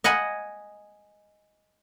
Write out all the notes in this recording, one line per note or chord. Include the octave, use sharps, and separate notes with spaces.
D#5 F#5 G#5 B5